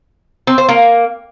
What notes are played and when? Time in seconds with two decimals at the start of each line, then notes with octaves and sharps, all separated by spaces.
0.47 C4
0.58 C5
0.69 A#3